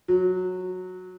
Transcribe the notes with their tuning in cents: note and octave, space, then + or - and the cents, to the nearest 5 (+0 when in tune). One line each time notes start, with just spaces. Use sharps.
F#3 -15